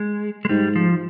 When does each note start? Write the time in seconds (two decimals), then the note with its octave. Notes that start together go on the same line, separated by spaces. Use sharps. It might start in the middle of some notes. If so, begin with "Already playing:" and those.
Already playing: G#3
0.45 G#3
0.49 G#2 G3
0.76 F3